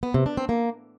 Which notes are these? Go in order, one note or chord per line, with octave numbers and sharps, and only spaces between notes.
B3
C3
D4
C4
A#3